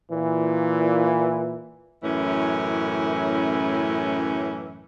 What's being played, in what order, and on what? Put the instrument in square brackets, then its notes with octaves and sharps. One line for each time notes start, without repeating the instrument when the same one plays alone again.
[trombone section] A#2 E3
[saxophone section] F#2 A2 E3 C#4